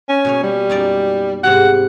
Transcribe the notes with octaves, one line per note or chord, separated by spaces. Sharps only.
C#4
B2 A#3 C#5
G3
F#2 D#4 D5
G#2 C3 G3 F#5